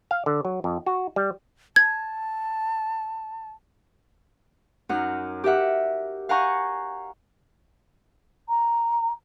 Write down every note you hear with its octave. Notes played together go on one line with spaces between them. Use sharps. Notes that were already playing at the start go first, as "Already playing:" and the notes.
F5
D3
F#3
F2
F#4
G3
A5 G#6
F#2 D#4 F#5 F6
G4 A#4 E5 F#5
F5 F#5 G#5 A#5 C#6 G6
A#5